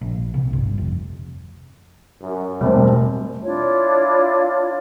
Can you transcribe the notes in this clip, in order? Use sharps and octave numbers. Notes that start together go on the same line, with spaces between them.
A#1
C2
G1
F1
F#2
E1 B2 G3 A3 C4
D4 E4 F4 C#5